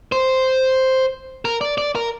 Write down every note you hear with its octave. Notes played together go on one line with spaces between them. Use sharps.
C5
A#4
D5
D5
A#4